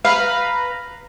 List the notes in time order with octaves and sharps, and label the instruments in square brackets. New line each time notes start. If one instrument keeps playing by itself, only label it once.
[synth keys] B4 A#5 B5 [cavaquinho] F5